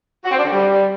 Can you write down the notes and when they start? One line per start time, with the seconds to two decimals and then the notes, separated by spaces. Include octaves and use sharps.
0.25 F#4
0.31 C4
0.38 D4
0.45 D3
0.51 G3